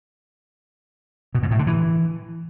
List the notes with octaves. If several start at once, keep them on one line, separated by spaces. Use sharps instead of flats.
B2
G#2
A2
D3
E3